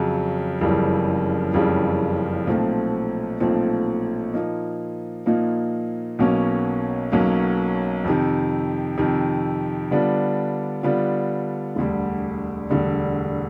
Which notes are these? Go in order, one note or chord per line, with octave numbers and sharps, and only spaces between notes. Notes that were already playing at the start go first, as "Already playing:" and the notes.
Already playing: F2 C#3 F#3
F#1 F2 C#3 E3 G3
F#1 F2 C#3 E3 G3
B1 A#2 F3 A3 C4
B1 A#2 F3 A3 C4
A#2 F3 A#3 D#4
A#2 F3 A#3 D#4
B1 B2 F#3 A#3 C#4
B1 B2 F#3 A#3 C#4
F2 C3 D#3
F2 C3 D#3
D3 G3 B3 D4 F4
D3 G3 B3 D4 F4
E1 D2 D3 G3
E1 D2 D3 G3